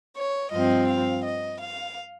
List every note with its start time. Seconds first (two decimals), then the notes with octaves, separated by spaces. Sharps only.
0.17 C#5
0.52 G2 F3 C4 D#5
0.88 F5
1.25 D#5
1.60 F5